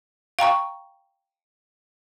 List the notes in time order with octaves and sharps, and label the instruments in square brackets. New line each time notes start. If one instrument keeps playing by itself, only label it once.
[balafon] F5 G5 A#5 C#6